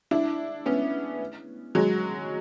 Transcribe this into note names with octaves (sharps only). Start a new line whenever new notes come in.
D4 E4
B3 C#4
F#3 G#3